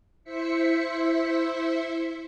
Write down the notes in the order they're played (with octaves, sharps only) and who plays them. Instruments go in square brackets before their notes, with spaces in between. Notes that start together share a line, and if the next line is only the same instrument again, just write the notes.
[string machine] E4 C5 E5 B6 C#7